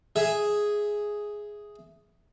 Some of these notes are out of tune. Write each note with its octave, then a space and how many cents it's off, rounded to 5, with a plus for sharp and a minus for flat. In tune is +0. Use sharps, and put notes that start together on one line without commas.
G#4 +0 E5 +0